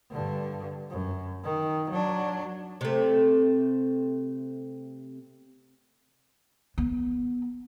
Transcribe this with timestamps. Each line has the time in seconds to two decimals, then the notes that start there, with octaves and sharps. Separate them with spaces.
0.11 G2 D3
0.90 F#2
1.44 D#3
1.91 F#3 D4
2.81 C3 A3
6.78 B3